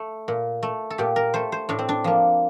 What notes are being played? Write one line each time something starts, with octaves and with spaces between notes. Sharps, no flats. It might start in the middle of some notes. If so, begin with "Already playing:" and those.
Already playing: A3
A#2
A3
A4
A#2 G4
A#4
A3 C5
C5
A2 D4
C4
D4
F3 A#3